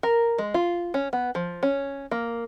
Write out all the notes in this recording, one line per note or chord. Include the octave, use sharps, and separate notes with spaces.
A#4
G#3
F4
C#4
B3
F3
C#4
A#3